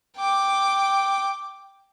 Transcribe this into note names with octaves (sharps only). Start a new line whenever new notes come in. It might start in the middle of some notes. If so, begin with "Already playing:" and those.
G5 D6